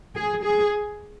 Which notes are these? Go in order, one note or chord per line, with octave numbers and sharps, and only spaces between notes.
G#4
G#4